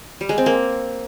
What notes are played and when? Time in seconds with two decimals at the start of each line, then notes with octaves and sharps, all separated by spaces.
0.21 G3
0.29 G#3
0.38 C4
0.46 A#3